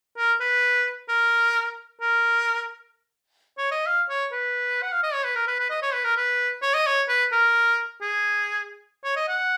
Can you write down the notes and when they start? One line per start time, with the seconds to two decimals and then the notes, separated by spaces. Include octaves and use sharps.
0.17 A#4
0.40 B4
1.09 A#4
2.01 A#4
3.58 C#5
3.71 D#5
3.86 F5
4.09 C#5
4.32 B4
4.82 F#5
4.92 F5
5.03 D#5
5.13 C#5
5.24 B4
5.35 A#4
5.47 B4
5.59 B4
5.70 D#5
5.82 C#5
5.93 B4
6.04 A#4
6.17 B4
6.62 C#5
6.74 D#5
6.86 C#5
7.08 B4
7.32 A#4
8.01 G#4
9.04 C#5
9.16 D#5
9.28 F#5